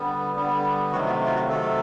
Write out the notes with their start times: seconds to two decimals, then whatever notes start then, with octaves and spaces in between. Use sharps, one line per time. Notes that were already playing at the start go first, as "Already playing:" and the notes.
Already playing: D3 G3 B3
0.35 D3 G3 B3
0.92 C3 D#3 F#3 A3 F#4
1.06 F4
1.25 F4
1.35 F#4
1.49 C3 D#3 F#3 A3 A4